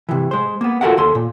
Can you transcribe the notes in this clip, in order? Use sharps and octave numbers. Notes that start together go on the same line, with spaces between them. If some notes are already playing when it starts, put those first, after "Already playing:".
C3 E3
G#3 C5
A#3 B3
F4 F#4 A4 A#4 E5 F#5
D#2 A4 C6
A#2